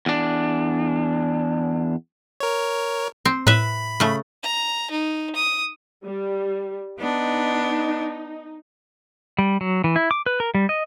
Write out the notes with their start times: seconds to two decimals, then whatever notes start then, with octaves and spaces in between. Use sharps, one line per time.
0.06 E2 D4
2.40 A#4 C#5
3.25 C4
3.47 A2 B4 E5 B5
4.00 C#3 A3
4.43 A#5
4.91 D#4
5.36 D#6
6.06 G3
6.99 B3 D4 D#4
9.39 G3
9.61 F#3
9.84 E3
9.96 E4
10.11 D6
10.26 B4
10.40 A#4
10.55 G3
10.69 D#5